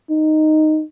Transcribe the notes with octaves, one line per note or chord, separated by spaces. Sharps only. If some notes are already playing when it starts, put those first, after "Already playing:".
D#4